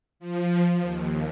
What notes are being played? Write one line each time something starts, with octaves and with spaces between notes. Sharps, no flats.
F3
D#2